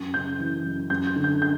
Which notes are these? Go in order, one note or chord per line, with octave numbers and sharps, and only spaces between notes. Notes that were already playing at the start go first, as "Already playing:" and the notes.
Already playing: F#2
C#3 G6
E3
F#2
F#2 G6
G6
D3
G6
G6